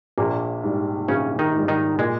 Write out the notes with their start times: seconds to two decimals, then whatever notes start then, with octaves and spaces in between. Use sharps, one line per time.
0.18 A#1 A#2 A#3
0.63 G#2 G3
1.08 A#1 C#3 C#4
1.39 D#3 D#4
1.54 G#2 G3
1.68 D#3 D#4
1.98 A#2 G#3